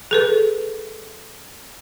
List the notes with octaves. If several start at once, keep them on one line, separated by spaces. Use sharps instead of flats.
G#4 A4 B4